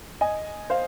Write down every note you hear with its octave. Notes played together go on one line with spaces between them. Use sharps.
D#5 G#5
C5 F5